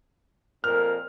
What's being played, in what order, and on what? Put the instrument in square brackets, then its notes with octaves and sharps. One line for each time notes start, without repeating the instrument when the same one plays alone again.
[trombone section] F2 A#2 A#4 [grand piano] F6